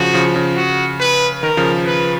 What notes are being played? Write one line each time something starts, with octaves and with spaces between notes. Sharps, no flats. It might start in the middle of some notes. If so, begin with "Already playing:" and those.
Already playing: C#3 F3 F#4
C#3 F3
C#3
F#4
B4
D#3 A#4
C#3 F3
B4